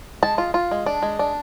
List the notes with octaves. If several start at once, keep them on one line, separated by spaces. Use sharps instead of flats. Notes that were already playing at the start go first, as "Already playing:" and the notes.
G#3 A5
F4
F4
G#3
D4
G#3
D4